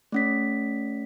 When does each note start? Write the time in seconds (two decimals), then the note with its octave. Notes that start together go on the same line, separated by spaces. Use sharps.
0.12 A3 C#4 B6